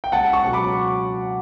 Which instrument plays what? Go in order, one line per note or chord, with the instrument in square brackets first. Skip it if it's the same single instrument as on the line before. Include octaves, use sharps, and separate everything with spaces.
[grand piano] G5
C#2 F#5 A5
A5 C#6
B2 F#3
B5 D6